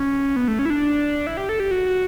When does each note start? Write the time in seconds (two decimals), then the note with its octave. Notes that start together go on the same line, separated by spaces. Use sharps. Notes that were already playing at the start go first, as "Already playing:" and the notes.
Already playing: C#4
0.36 B3
0.48 A3
0.59 C#4
0.65 E4
0.70 D4
1.27 E4
1.37 G4
1.49 A4
1.60 G4
1.71 F#4
1.86 F#4